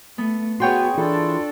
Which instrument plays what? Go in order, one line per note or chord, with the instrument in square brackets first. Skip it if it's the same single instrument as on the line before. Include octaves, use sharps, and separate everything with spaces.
[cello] A3 [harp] B3
[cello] B3 G#4 [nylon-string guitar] F#4 F#5 [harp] C#5 G5 C6
[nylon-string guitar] E3 F4 G#4 [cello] D4 A4